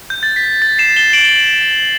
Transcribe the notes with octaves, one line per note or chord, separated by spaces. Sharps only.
G6
A6
B6
A6
C7 E7
E7 G7
D7 F#7